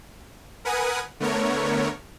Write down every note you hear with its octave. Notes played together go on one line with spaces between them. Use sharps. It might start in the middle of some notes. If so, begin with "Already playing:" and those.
A#4 B4 F#5 G#5 D#6
D3 A3 B3 A#4 C#5